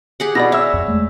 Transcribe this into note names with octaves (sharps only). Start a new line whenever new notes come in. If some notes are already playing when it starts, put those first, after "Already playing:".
G4 G#4 F#5
B2 D5 B5 A#6
C#5 E5 E6
F2
G#3 A3